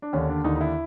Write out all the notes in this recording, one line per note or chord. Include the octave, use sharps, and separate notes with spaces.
D4
D#2 D3 C#4
D4
D#2 D3 D#4
D#4
E4